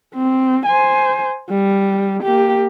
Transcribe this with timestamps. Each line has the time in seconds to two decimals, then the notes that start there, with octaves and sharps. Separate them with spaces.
0.14 C4
0.66 C5 G#5
1.50 G3
2.23 A#3 G4